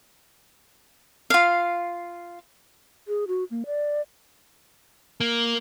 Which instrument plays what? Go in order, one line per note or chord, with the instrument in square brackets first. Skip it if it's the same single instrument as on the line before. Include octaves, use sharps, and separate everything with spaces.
[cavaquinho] F4 F5
[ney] G#4
F#4
A#3
D5
[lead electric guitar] A#3